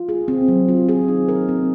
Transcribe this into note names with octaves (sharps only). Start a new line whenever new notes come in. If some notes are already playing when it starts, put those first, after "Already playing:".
Already playing: F4
G#4
C4
F#3
F4
G#4
D#4
A#4
C4